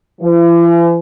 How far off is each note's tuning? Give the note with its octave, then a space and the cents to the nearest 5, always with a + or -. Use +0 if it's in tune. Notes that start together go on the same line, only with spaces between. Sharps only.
E3 +45